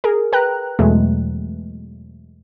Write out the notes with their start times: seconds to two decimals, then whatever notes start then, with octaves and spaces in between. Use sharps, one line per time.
0.04 G#4 A#4
0.33 B4 G5 A#5 F#6
0.79 E2 B2 E3 F#3 G#3 A3